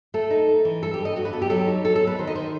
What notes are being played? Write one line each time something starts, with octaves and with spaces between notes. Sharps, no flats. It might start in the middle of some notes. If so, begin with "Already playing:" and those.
A3 A4
D#4
A3
E3
G2 A4
G4
G2
D#5
G2 F#4
B4
B3 A4
G4
F#3 A4
D#4
F#3 A4
A4
B3
B4
D#3 C5
D#5
D#3 C5